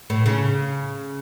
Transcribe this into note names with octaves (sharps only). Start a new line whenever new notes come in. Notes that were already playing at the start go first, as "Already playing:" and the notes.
A2
C#3